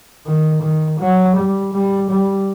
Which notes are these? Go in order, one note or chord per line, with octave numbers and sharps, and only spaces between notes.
D#3
D#3
F#3
G3
G3
G3